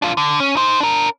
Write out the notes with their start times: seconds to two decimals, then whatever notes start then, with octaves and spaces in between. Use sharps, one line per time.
0.02 D4 F4
0.17 D3
0.40 C#4
0.57 D#4 C5
0.80 D4 A#4